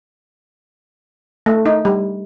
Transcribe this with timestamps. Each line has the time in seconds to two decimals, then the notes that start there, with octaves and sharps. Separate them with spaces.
1.46 A3
1.66 D#4
1.85 G3